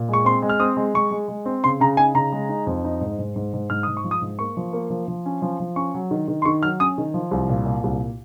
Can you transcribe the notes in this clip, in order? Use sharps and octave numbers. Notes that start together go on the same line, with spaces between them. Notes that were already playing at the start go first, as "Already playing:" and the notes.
Already playing: A#2
G#3 C#6
C4 C6
G#3
F6
C4 D#6
G#3
G#3 C#6
G#3
G#3
C4
C#3 C6
C#3 A#5
D#4 G#5
C#3 A#5
G#3
D#4
F2
D#4
G#2
G#2
G#2
G#2
G#2 F6
G#2 D#6
C#6
F3
D#6
G#2
A#3 C#6
F3
A#3
F3
F3
C#4
F3
F3
C#4 C#6
F#3
D#3
D#3
C6
D#3 C#6
F#3 F6
C#4 D#6
D#3
F3
C2
A#2
A#2
C2